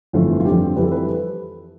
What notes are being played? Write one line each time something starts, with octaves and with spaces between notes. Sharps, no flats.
G1 F2 E3 A3 F4
F4
F2 D3 G3 G4
F2 E3 G3 B4
A4
B4